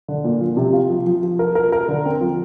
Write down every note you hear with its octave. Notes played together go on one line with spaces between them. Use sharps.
D3
A#2
F3
C3
F4
F3
F3
F3
A#4
A#4
A#4
D3
C4
F3